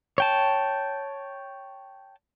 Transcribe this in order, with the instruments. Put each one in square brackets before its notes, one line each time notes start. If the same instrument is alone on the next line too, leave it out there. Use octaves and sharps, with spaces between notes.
[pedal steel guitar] C#5 G5 A5